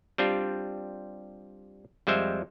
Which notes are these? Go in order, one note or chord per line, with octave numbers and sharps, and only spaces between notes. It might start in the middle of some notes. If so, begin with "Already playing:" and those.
G3 C4 D4 F4 G4
F2 G3 G#3 C5 E5